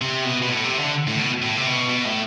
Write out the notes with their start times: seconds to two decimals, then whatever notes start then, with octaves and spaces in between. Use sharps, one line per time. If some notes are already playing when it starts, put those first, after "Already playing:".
0.02 C3
0.25 B2
0.42 B2
0.49 A2
0.64 C3
0.79 D3
1.08 A2
1.19 B2
1.42 A2
1.57 C3
1.67 B2
1.89 B2
2.05 A2